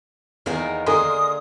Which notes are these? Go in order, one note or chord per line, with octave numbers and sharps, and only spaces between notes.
E2 D#3 A#3 B3 G#4
D3 A#4 G#5 C6 D#6